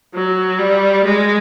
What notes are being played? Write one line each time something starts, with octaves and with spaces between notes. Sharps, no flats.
F#3
G3
G#3